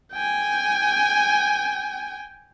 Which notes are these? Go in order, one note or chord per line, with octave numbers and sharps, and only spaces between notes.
G5 G#5